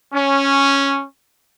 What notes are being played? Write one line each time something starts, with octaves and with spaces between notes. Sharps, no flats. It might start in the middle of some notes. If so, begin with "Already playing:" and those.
C#4